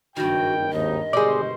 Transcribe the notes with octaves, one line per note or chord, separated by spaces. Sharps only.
F#1 G2 D#3 F#4 G5
G#1 D#2 D#4 D#5
G1 B2 G#3 G4 G#4 C5 D5